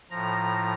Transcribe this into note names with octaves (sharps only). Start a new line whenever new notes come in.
A2 F3 A#5